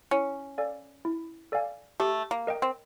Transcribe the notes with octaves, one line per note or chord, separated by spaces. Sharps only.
C#4 E4
A4 D5 F5 G#5
E4
A4 D5 F5 G#5
A3 G4
A#3
A#4 D#5 G5
C4